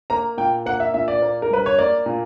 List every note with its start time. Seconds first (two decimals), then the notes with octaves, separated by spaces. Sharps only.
0.10 A#3 A#5
0.37 A#2 G5
0.66 A#3 F#5
0.80 E5
0.94 A#2 E5
1.08 D5
1.22 A#3
1.42 A#4
1.51 G2 B4
1.66 C#5
1.79 A#3 D5
2.06 A#2